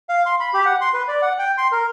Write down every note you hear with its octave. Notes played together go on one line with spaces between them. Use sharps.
F5
C6
B5
G4
F#5
C6
B4
D5
F#5
G5
C6
A#4